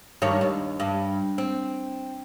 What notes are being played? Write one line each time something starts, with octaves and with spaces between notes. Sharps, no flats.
G2 D#3 C#5
D#2
G2
C4